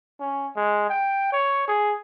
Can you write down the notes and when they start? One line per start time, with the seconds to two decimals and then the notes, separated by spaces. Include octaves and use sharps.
0.20 C#4
0.56 G#3
0.89 G5
1.32 C#5
1.68 G#4